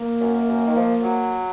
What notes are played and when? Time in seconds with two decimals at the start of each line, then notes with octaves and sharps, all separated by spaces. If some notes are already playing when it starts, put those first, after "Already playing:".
Already playing: A#3
0.21 F#2
0.48 F#2
0.67 D#3
0.76 F3
1.03 F#3